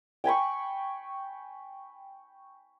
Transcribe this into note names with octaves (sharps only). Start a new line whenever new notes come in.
G5 G#5 B5 C#6